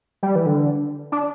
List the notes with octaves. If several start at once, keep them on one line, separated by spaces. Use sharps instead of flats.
G3
E3
D3
D4